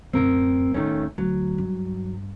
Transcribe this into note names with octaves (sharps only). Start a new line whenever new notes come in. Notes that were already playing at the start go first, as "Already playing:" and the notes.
D1 F#2 C4 A#4
E2 A2 D#3 A3 C#4
D2 F#3
G2